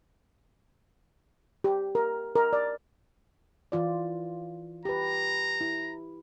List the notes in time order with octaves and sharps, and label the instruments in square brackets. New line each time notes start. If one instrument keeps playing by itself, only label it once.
[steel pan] G4
A#4
A#4
D5
[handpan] E3 F4 D5
[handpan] G4 B4 [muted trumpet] A#5
[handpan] E4